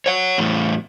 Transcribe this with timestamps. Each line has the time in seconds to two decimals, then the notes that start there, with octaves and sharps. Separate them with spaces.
0.06 C#5 F#5
0.38 E2 A2